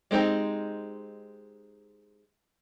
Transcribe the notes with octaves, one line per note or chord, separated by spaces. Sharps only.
G#3 C4 D#4 G4